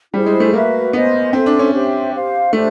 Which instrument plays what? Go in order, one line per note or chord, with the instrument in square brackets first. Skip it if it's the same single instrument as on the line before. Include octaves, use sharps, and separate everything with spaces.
[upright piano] G3 [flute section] E4 G#4 C5
[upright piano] G#3
A3
[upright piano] A#3 [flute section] F#4 B4 E5
[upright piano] B3 [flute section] C5 D#5 G#5
[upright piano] C4 [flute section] A4 C5 E5 G#5
[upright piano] D4
C#4
[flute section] G4 C5 E5 G5
G4 C5 F5
[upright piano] A3 [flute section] D4 G4 C5 E5